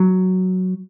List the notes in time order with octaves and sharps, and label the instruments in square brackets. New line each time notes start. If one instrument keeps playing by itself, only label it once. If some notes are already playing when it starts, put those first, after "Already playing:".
Already playing: [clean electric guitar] F#3